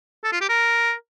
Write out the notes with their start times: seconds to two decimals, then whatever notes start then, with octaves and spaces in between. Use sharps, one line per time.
0.24 A4
0.32 F4
0.41 G4
0.49 A#4